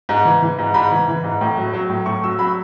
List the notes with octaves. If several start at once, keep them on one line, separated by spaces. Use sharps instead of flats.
G#2
E3
E3
G#2
G#2 B5
E3
E3
G#2
A2
F#3
F#3
A2
A2 C#6
F#3 E6
F#3 B5